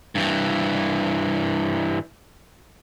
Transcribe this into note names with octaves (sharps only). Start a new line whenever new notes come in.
G2 E3